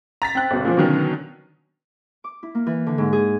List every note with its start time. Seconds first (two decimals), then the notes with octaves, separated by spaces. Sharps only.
0.22 A#5 A6 B6
0.35 C4 F#6
0.51 G1 B2
0.65 A#2 F3
0.77 B2 D3 D#3 F#3 C#4
2.24 D6
2.43 E4
2.55 A#3
2.66 E3
2.86 D3
2.98 G#2
3.13 G#4